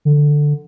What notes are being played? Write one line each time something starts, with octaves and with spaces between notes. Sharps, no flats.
D3